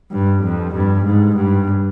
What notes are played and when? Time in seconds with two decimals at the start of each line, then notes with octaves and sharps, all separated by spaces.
0.12 G2
0.43 F2
0.75 G2
1.05 G#2
1.37 G2